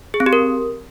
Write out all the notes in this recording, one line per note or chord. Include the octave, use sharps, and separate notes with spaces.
G#4
C4
G4
A#4